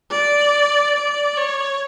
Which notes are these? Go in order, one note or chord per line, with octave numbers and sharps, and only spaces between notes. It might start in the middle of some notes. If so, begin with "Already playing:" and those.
D5
D5
C#5